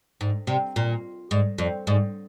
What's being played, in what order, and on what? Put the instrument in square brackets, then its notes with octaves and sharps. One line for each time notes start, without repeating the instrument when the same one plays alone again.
[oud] G#2
C3
A#2
G#2
F2
G#2